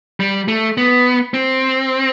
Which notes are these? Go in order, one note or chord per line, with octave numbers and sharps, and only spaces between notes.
G3
A3
B3
C4